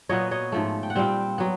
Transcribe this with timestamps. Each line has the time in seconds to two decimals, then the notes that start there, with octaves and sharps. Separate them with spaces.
0.09 A#2 F#3 B3 C#5 D#5
0.31 C#5 D#5
0.52 G#2 F3 A3
0.83 G5
0.90 F#5
0.95 A#2 G3 C4 F5 G5
1.38 F#3 B3